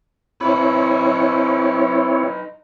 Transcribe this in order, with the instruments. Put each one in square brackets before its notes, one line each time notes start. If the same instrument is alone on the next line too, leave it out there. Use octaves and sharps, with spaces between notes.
[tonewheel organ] C4 E4 C#5 [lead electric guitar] D#4 B4